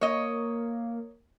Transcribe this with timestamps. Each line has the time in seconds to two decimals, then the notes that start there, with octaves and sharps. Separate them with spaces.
0.01 A#3 C#5 D#5